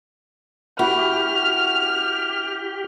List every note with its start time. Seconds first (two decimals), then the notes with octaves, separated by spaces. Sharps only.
0.79 E4 F#4 G4 F6